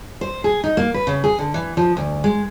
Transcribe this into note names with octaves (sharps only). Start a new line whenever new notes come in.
C5
G#4
D#4
A#3
B4
C#3
G#4
D3
E3
F3
D2
G#3